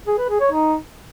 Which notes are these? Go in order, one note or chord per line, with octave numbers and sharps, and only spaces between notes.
G#4
B4
G#4
C#5
D#4